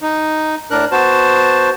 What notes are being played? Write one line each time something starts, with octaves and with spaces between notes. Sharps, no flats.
D#4
A2 D4 A#4 F#6
B3 F#4 C5 A5